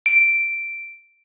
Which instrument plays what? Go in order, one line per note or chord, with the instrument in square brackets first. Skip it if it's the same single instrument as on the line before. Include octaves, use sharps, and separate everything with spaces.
[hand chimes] D7